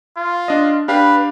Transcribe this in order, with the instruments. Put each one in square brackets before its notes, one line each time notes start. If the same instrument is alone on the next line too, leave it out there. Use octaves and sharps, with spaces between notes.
[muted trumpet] F4
[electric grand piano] D4 D#5
[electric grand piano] D4 G4 F5 [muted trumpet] B4